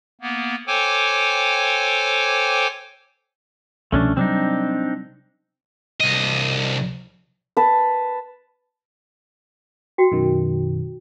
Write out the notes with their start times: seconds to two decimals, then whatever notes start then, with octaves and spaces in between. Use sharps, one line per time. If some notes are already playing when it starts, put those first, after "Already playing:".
0.21 A#3 B3
0.67 A4 C5 C#5 G5 G#5 D6
3.92 C2 B2 F3 A3 C#4 D4
4.17 C3 F#3 G3 C4 D4 D#4
6.00 C2 D#5
7.57 B4 A5
9.98 F#4 G5
10.12 F#2 B2 D#3